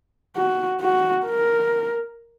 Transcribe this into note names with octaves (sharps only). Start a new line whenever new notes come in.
F#4
F#4
A#4